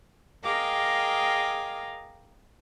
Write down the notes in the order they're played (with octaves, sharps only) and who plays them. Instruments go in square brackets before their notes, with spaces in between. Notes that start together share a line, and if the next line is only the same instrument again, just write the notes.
[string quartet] G#4 A#4 D#5 F5 G5 D6